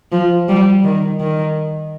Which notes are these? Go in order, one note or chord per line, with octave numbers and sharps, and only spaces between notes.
F3
G3
D#3
D#3